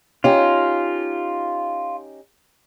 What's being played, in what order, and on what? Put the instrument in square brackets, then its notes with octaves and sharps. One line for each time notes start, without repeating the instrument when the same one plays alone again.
[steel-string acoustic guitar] C#4 D#4 G4 [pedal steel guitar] F4